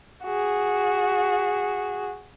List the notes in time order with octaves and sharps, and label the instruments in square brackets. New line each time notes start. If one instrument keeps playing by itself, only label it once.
[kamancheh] F#4 G#4